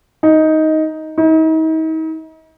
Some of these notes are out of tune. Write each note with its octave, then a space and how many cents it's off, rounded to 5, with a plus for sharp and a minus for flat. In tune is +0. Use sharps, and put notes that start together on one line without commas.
D#4 +10
D#4 +40